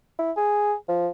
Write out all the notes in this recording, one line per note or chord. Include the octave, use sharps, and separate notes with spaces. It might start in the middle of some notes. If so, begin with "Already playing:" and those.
E4
G#4
F3